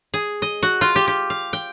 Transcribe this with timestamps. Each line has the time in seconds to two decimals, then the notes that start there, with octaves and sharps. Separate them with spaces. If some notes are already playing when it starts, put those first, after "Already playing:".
0.14 G#4
0.42 D#5
0.63 F#4
0.81 F4
0.96 G4
1.08 G4
1.30 F5
1.53 G5